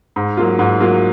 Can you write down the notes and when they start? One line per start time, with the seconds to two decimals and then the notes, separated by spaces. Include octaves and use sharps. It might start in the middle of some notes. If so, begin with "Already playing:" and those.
0.16 G#2
0.37 F#3 A#3 F4
0.59 G#2
0.80 F#3 A#3 F4